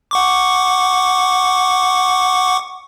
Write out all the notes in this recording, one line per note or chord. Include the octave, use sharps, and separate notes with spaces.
F#5 C#6 D6